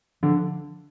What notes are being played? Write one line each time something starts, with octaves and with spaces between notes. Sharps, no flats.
D3 F3